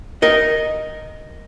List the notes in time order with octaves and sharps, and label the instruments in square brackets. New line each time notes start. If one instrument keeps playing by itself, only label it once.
[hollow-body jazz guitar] A#4 D#5